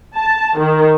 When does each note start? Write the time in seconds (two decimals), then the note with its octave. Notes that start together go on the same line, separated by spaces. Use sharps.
0.15 A5
0.58 D#3